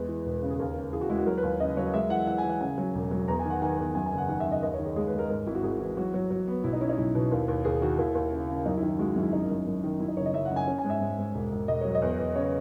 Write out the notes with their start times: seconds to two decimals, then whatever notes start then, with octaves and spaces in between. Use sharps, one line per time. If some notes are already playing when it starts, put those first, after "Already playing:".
Already playing: E2 G#3 B4
0.09 E3
0.25 E1
0.42 C#3
0.50 G#4
0.59 D#2 A#4
0.76 C#3
0.93 E3 G#4
1.01 F#4
1.10 G#3 E4
1.18 F#4
1.26 F#3 A#4
1.38 B4
1.43 D#2
1.60 C#3 D#5
1.77 F#3 C#5
1.94 G#3 E5
2.10 E3 F#5
2.27 E3 F#5
2.38 G#5
2.44 E3
2.50 F#5
2.61 C#3 G#5
2.78 F#3
2.95 E1
3.11 F#3
3.28 E2 A#5
3.39 G#5
3.45 D#3 F#5
3.62 D#3 G#5
3.78 E2
3.95 F#2 G#5
4.06 G#5
4.12 F#1
4.18 F#5
4.29 D#3 F#5
4.40 E5
4.46 F#1
4.52 D#5
4.62 D#2 D#5
4.73 C#5
4.79 D#3
4.85 G#4
4.96 G#3 G#4
5.07 B4
5.13 G#3
5.19 A#4
5.29 G#2 A#4
5.47 G#1 E4
5.55 F#4
5.63 G#1 G#4
5.80 E3
5.97 F#3 F#4
6.14 F#3
6.31 F#3
6.48 B3
6.64 B1 E4
6.73 D#4
6.81 C#4 E4
6.89 D#4
6.98 B1 E4
7.15 B2
7.32 D#2
7.48 D#2
7.65 D#2 G#4
7.81 D#3 F#4
7.98 D#2 E4
8.15 D#2
8.32 C#3
8.49 C#3
8.66 F#2 D#4
8.77 E4
8.82 D#3
8.88 E4
8.99 G#3 F#4
9.10 E4
9.16 F#2
9.22 E4
9.33 G#1 D#4
9.50 F#2
9.67 F#2
9.84 D#3
10.00 F#2 E4
10.08 D#4
10.17 F#1 C#5
10.26 D#5
10.34 F#1 E5
10.45 F#5
10.51 F#1
10.56 G#5
10.67 C#4
10.78 G#5
10.84 G#2
10.90 E5
11.01 G#2
11.18 G#2
11.34 E1
11.52 E1
11.68 E1 D#5
11.81 F#3 C#5
11.95 D#5
12.02 E2
12.18 E2
12.35 C#3 C#5